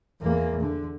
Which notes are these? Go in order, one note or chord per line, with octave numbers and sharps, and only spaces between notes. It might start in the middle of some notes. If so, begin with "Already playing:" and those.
E2 A#3
D3